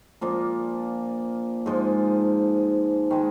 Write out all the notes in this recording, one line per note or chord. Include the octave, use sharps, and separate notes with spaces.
A#2 F3 A#3 D4
G#2 F3 G#3
D#3 G#3